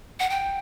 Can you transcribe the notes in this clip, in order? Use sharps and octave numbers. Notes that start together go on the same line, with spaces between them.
F#5
G5